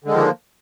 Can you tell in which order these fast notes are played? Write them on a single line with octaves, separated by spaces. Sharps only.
D3 G#3 D#3 F3 A#3